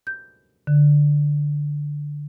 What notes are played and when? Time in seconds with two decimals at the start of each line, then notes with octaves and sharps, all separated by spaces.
0.07 G6
0.67 D3